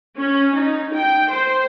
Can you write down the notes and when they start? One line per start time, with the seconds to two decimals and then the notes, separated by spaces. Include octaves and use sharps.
0.17 C#4
0.55 D#4
0.93 G5
1.31 C5